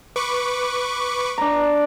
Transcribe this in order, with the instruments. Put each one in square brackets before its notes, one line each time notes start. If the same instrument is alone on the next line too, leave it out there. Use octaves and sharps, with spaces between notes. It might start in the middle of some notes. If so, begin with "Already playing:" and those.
[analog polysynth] B4 C#6 D6
[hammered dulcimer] D4 A#5